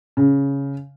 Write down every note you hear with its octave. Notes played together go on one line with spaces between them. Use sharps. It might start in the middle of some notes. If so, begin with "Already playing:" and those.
C#3